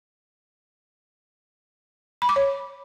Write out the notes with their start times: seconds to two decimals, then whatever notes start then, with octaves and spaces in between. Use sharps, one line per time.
2.22 B5
2.29 D6
2.36 C#5